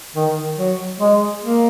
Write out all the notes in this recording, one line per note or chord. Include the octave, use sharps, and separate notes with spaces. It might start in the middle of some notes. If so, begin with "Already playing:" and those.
D#3
F#3
G#3
A#3